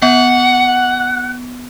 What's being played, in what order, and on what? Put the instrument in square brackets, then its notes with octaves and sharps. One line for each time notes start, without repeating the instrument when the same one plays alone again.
[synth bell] B3 [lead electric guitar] F#5